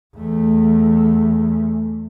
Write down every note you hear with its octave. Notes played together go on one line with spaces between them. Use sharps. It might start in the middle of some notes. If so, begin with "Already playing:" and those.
E2 A3